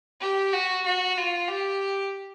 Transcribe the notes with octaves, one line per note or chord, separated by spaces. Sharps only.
G4
F#4
F#4
F4
G4